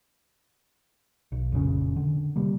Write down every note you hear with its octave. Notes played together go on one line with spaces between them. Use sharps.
B1
F1 A#2 C#3 C#4
D3
C3 G3 A#3